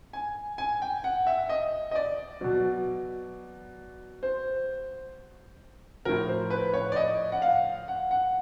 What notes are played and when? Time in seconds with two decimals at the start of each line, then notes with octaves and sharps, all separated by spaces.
0.13 G#5
0.58 G#5
0.82 G5
1.04 F#5
1.27 E5
1.49 D#5
1.91 D#5
1.95 D5
2.41 B2 F#3
4.23 C5
6.05 A2 F3 A#4
6.28 C5
6.50 B4
6.74 C#5
6.92 D5
6.96 D#5
7.32 F#5
7.42 F5
7.88 F#5
8.11 F#5